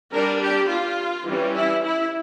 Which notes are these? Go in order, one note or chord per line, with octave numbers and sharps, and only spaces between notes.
G3 D4 A#4
G4
F4
E3 G3 C#4
E4
E4